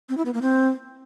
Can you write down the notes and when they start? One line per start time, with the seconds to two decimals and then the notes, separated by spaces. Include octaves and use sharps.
0.09 C4
0.17 E4
0.25 B3
0.34 A#3
0.42 C4